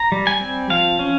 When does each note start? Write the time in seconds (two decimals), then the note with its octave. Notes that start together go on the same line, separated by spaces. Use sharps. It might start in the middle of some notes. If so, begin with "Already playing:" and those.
Already playing: A#5
0.12 G3
0.27 G#5
0.41 C4
0.70 F3 F5
0.99 C#4